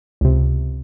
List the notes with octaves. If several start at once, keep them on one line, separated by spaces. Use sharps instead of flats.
C#2 C3